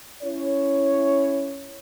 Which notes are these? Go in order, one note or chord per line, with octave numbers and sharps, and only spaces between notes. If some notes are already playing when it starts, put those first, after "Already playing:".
C#4 E4 C#5